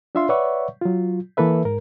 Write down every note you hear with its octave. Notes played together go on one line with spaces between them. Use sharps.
D4 F4 E5 F5 C6
B4 C#5 D5 E5 F#5 C#6
F#3 F4
E3 A#3 A4 B4 E5
G#2 A#4